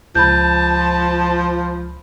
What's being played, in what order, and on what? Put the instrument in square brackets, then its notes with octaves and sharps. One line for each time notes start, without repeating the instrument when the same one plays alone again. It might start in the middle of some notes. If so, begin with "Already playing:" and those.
[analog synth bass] C#2 [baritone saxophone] F3 [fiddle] A5 [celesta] B5 G6